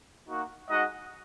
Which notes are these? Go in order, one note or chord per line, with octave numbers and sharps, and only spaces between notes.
A#3 D#4 F#4
G#3 D#4 F#4 D#5 F#5